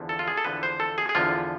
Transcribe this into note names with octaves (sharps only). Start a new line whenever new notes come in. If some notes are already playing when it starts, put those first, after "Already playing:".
Already playing: E2 D3 F3
A4
F4
G#4
A4
E2 D3 F3 B4
C5
A4
G#4
G#4
E2 D3 F3 F4